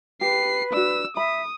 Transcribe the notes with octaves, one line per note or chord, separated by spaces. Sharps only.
G4 B4 C7
D4 F#4 E6
E5 B5 D#6